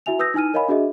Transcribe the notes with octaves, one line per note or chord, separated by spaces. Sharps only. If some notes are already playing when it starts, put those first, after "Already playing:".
E4 F#4 E5 G#5 F7
B4 D#6 E6 G6 A#6
D#4 E4 G#5 F6 D#7
A#4 C#5 D#5 F5 G#5 B5
D4 F#4 G#4 D#5 E5